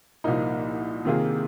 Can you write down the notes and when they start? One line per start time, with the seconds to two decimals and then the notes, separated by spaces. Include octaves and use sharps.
0.24 C2 A#2 F3 A#3 D#4
1.05 C3 D#3 A#3 F4 G#4